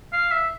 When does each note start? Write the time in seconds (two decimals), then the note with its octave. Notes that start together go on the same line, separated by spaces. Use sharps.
0.13 F5
0.31 E5